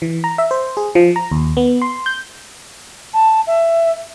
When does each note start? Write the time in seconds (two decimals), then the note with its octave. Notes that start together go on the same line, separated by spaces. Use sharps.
0.02 E3
0.24 A#5
0.38 E5
0.51 C5
0.77 G#4
0.95 F3
1.16 A#5
1.32 D#2
1.57 B3
1.82 C6
2.06 G6
3.14 A5
3.47 E5